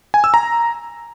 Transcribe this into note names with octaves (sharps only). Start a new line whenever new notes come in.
G#5
E6
A#5